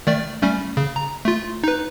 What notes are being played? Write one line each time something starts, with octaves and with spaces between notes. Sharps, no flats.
D#3 A3 D5
G3 A3 C#4
C#3
A#5
A3 F4
D#4 B4